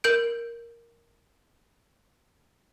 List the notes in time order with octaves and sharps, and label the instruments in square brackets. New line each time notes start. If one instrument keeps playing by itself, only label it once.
[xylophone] A#4 G6 D7